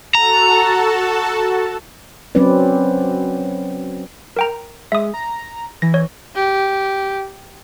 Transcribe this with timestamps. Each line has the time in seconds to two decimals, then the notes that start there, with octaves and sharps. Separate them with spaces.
0.15 F#4 A4 A5 A#5
2.35 F#3 C4 C#4 B4 D5
4.37 A#4 G5 A#5
4.92 G#3 E5 D#6
5.14 A#5
5.82 E3 A#6
5.94 C#5
6.35 G4